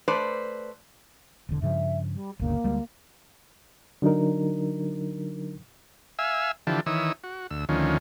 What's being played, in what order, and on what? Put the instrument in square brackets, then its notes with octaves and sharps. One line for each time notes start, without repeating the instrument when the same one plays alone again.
[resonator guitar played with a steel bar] A3 B4 C5 D5
[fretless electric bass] E1 D3
[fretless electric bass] G2 C#3 F3 [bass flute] E5
[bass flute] G3
[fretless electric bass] G1 D2 C#3 [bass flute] A#3
[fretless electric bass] D2 G3 G#3
[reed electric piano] D3 F#3 D4 D#4 A#4
[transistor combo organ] E5 F5 G#5 E6
D3 E3 F3 G4 A4
D#3 E3 C#5 D#6 E6
F#4
D2 E6
D2 D#3 F3 C#4